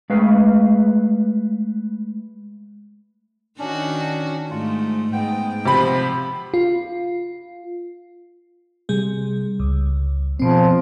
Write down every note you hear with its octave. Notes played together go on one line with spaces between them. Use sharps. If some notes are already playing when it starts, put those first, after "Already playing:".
G#3 A3 B4 F5
D#3 C#4 D4 F#4
G#2 A3 F4
G#2 B3 G5
C3 F3 F4 B5
F4
C3 G3 G#4
C#2
B2 F3 C4